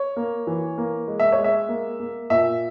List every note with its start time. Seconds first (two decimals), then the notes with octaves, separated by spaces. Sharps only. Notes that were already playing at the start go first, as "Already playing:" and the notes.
Already playing: C#5
0.16 A#3
0.47 E3
0.78 A#3
1.07 G#3
1.20 E5
1.32 C#5
1.38 G#3
1.44 E5
1.69 A#3
2.00 A#3
2.30 A#2 E5